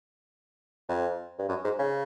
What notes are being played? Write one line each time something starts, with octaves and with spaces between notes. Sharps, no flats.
F2
G2
F#2
G#2
C#3